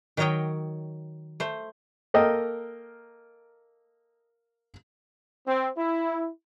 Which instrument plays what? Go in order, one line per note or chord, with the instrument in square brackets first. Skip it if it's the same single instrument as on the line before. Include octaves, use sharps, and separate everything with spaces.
[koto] D#3 F#3 A#4 C#5 D#5 G5
A3 C5
[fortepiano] A#3 A4 A#4 D#5 G5
[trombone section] C4
E4